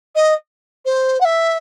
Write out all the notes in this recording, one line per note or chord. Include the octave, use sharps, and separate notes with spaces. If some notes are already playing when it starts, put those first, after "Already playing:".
D#5
C5
F#5
E5